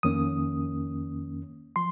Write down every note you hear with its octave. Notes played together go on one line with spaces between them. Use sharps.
F2 D#3 A#3 C#4 D#6
F3 C6